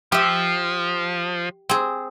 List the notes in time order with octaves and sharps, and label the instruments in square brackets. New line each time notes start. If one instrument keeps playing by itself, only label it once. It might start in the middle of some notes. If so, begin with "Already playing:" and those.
[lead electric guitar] F3 [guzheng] G4 E5
[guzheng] C4 G#4